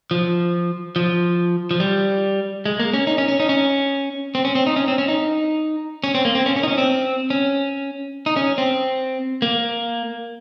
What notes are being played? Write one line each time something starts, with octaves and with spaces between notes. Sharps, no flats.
F3
F3
F3
G3
G#3
A#3
C#4
D#4
C#4
C#4
D#4
C#4
C4
C#4
C4
D#4
C#4
C4
C#4
D#4
C#4
C4
A#3
C4
C#4
C#4
D#4
C#4
C4
C#4
D#4
C#4
C4
A#3